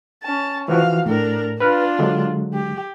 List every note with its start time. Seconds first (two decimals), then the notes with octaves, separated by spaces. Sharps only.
0.23 C#4 A5
0.68 E3 F3 F#4 F5
1.06 A2 D4 A#4
1.60 D4 F4 B4 F6
1.99 D3 F#3 G#3
2.53 G4